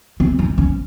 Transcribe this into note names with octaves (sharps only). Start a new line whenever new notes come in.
C4
D#4
C#4